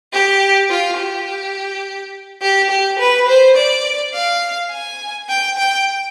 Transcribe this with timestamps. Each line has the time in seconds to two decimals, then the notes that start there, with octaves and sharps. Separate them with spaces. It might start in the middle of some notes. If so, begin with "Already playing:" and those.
0.13 G4
0.70 F4
0.99 G4
2.42 G4
2.70 G4
2.99 B4
3.28 C5
3.57 D5
4.14 F5
4.71 G#5
5.29 G5
5.58 G5